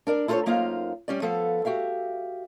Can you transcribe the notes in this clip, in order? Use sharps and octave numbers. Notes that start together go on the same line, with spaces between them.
D4 A#4 D5
E4 F4 A4 A#4 C5 C#5
F#2 A#3 D#4 F4 C5 F5
G3 C#4 D5
F3 B3 A4 F5
F#4 G4 E5 F5